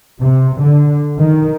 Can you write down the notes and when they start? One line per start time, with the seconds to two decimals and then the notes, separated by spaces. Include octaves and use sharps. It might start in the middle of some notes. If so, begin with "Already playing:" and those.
0.20 C3
0.59 D3
1.18 D#3